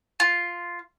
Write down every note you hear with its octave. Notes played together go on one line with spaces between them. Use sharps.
F4